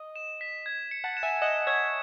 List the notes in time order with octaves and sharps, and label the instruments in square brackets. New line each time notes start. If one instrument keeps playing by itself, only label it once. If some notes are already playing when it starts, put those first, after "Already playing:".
Already playing: [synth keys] D#5
[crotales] E7
B6
G#6
C#7
[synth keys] F#5 A5
[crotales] E7
[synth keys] E5 G#5
[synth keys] D#5 F#5 [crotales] E7
[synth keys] C#5 E5 [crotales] G#6